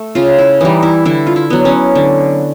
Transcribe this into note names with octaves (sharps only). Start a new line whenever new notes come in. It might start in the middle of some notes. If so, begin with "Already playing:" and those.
Already playing: A3
C#3 F4
E4
E3 G3 D#4
E4
D3 E4
F4
E4
F#3 B3
C#4
D3